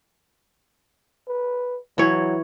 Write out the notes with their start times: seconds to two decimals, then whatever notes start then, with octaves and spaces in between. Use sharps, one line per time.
1.28 B4
1.98 E3 F#3 C#5